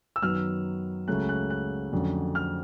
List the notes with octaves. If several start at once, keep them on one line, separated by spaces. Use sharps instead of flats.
E6
F#2 D#3 F#3 B3 F6
C#2 C#3 F#3 A3 C#4 F#6
F#6
F#6
F2 D3 F#3 A3 C#4
F6